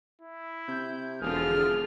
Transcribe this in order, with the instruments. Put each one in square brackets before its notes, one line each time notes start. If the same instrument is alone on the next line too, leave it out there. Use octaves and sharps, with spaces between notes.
[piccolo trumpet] E4
[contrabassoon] C3 [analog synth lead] G6
[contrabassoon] E1 [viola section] D3 F3 F4 [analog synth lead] G#4 [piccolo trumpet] F6